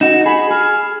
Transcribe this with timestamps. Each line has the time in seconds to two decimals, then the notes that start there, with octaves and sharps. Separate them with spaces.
0.01 D#4 F#4 E7
0.26 G#4 B5
0.51 G#4 F6